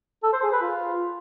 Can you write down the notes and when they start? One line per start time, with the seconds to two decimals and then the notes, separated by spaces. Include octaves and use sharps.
0.23 A4
0.33 C5
0.43 G#4
0.52 B4
0.62 F4